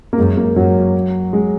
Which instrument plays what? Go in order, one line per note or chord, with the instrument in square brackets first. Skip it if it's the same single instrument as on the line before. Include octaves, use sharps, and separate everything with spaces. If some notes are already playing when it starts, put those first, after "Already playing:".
[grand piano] A#3
[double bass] F#2 [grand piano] G#3
[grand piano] A#3
[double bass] F#2 [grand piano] F#3
[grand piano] G#3